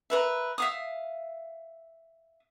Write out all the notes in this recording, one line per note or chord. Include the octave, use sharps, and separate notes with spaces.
A#4 B4 E5
E5 F5 D#6